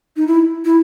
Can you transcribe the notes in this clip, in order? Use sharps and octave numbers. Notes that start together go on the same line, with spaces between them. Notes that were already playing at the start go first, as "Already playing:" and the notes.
D#4
E4
E4